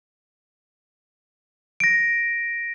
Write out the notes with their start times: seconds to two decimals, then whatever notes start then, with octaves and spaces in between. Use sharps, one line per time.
1.80 A#6 D7